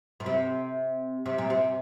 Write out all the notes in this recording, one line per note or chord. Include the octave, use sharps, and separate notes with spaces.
A#2
C3
C3
A#2
C3